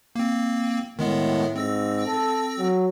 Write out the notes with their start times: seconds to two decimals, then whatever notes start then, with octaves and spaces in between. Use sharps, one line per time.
0.16 A#3 C4
0.99 A2 D#3 G#3 B3
1.56 G#2 C4 E6 A#6
2.06 A4
2.58 F#3